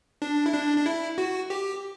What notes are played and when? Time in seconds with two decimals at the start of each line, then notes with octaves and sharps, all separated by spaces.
0.22 D4
0.46 E4
0.53 D4
0.77 D4
0.86 E4
1.18 F#4
1.50 G4